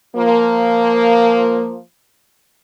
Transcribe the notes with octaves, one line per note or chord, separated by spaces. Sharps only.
F3 A#3